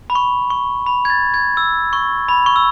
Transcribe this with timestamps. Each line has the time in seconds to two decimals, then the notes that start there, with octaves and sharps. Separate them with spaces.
0.10 B5
0.15 C#6
0.50 C#6
0.86 B5
1.05 G#6
1.10 A6
1.34 G#6
1.57 E6
1.93 C#6
2.28 B5
2.46 C#6
2.56 E6